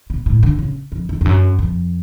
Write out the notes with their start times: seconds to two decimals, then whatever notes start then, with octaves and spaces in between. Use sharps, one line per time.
0.10 B2
0.26 A2
0.43 D3
0.59 C#3
0.92 F2
1.09 F2
1.21 F2
1.25 F#2
1.59 F2